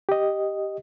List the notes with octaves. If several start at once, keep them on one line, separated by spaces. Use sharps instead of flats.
G4 D#5